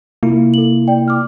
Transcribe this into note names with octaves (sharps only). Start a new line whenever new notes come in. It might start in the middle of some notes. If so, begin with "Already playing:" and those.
C3 A#3 E4 F4
A4 F#7
D5 G5
D6 F6